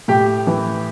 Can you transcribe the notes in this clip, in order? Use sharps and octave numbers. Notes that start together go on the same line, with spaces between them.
A2 G4
E3